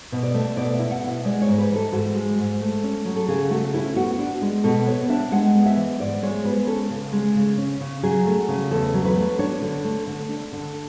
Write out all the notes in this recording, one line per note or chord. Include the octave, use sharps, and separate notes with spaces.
B2
D5
A3
B2 D5
E5
E4
F#5
B2
E5
G#3 D5
C#5
G#2
B4
E3
A4
G#2 F#4
G#3
G#2
A3
C#4
F#3
A4
C#3 G#4
A3 F#4
C#4 E4
B3 F#4
D4
G#3
B2 A4
B3 C#5
D4 E5
G#3 F#5
B3
E5
E3
G#2 D5
G#3 C#5
B3 B4
C#4 A4
C#3
G#3
C#3
C#4
C#3
F#3 G#4
A3
C#3
E2 A4
F#3
B4
A3
D4 C#5
D3
A3
D3
D4
D3